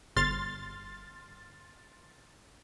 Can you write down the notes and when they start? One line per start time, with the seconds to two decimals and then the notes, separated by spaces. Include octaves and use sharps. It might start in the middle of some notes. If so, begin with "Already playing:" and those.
0.16 G1 C6 F6 A6